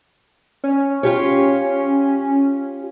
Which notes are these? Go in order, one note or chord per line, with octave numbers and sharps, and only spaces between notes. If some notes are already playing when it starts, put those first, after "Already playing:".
C#4
F4 G4 C#5